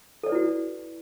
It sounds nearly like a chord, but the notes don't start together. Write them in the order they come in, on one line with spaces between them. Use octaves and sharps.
A4 D5 B4 E4 F#4